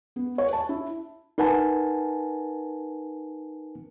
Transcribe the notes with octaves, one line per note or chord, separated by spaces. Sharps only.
B3
C#5
A5
E4
D#4 A#4 B4 F#5 G#5 A5